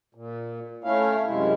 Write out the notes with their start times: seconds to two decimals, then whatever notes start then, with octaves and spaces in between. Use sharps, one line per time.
0.15 A#2
0.84 A3 C#4 E4 F5
1.26 F#2 C3 G#3 E4